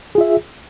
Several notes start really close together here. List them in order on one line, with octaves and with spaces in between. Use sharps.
G#4 F4 E5